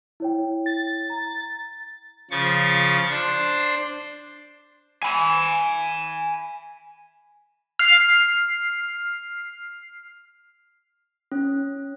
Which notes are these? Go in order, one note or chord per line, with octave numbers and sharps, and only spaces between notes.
E4 C#5 G5
A6
A#5
C#3 F3 C#6 A6
D4 C5
G#5 B5
F6 C7
C#4